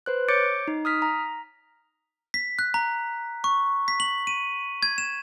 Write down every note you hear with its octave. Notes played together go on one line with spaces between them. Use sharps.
B4 C5 F#6
C#5 D6 G6 A6 C#7 D7
D#4
D#6 F6 B6
A#5
B6
F#6
A#5
C#6
B6
F#7
D#7
G#6
E7